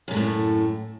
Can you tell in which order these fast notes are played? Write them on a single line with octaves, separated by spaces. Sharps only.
F#2 C3 A3 A2